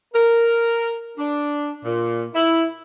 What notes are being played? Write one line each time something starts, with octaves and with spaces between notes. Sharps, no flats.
A#4
D4
A#2
E4